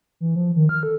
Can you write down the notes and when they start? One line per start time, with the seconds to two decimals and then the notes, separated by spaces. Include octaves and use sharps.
0.20 E3
0.36 F3
0.56 D#3
0.69 F6
0.83 A4